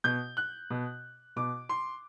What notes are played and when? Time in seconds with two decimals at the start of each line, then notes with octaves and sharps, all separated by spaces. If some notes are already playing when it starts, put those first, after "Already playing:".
0.04 B2 G6
0.37 F#6
0.70 B2
1.36 B2 D6
1.69 C6